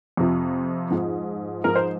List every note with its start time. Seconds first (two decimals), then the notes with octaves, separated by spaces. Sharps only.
0.17 F2 C3 F3
0.90 G#2 F3
1.64 G#2 F3 A#4
1.76 C5